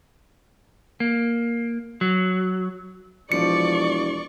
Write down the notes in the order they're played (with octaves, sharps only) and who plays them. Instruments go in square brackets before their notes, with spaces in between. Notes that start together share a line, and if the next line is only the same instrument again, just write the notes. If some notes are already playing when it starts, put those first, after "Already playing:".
[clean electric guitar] A#3
F#3
[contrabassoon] E1 [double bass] F3 [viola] D5 C#6 [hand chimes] C#7